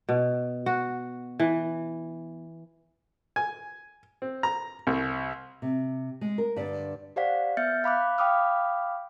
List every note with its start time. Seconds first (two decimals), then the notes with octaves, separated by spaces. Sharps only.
0.09 B2
0.66 F#4
1.40 E3
3.36 G#5
4.22 C4
4.43 A#5
4.87 C2
5.62 C3
6.21 G#3
6.38 A#4
6.56 G2 D3 G3 D5
7.16 G4 C5 D5 F5 F#5 B6
7.57 B3 E5 F6 G6 A6 C#7
7.84 F5 B5 D6 F#6
8.18 F5 G5 B5 D6 D#6 F6